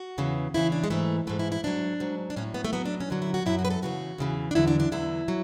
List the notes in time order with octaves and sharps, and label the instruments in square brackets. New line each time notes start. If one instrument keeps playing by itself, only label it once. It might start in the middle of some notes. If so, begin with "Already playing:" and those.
Already playing: [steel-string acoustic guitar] F#4
E2 C#3 E3
E2 C#3 E3 E4
D4
G#3
G#2 E3 A3
G#2 E3 A3
E4
E4
G#2 F#3 D4
G#2 F#3
D4
A2 F#3 C#4
B3
A3
A2 F#3 B3
D4
C#4
F#2 D3 F#3 D4
E4
F#4
F#2 D3 F#3 E4
F#4
B4
A4
E2 C#3 E3 F#4
E2 C#3 E3
D4
E2 D3 F#3 E4
D4
D4
E2 D3 F#3 E4
F#3